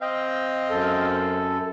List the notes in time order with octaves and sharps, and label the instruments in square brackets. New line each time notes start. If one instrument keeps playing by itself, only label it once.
[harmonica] C4 F5 [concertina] D#5 G5
[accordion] F#2 A4